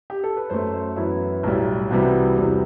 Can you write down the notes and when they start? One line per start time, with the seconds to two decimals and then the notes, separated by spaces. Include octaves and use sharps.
0.10 G4
0.24 A4
0.37 B4
0.50 F#2 F#3 A3 C5
0.74 C5
0.96 F#2 E3 B3 E4
1.43 B1 A2 G3
1.90 C2 C3 E3 G3 F#4
2.37 E2 C3 G3 B3